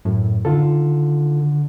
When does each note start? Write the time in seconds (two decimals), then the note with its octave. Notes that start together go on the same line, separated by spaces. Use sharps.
0.05 F#2 A2
0.45 D3 D#3 F4 A4